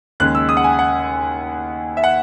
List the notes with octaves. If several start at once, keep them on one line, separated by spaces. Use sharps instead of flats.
D#2 C#3 G#3 F#6
E6
D#6
F#5
G#5
F#5
E5
F#5